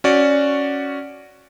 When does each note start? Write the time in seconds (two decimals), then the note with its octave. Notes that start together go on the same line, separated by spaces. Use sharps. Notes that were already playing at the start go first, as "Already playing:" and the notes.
0.04 C#4 F#4 D5